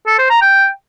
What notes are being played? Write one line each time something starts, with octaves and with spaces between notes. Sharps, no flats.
A4
C5
A#5
G5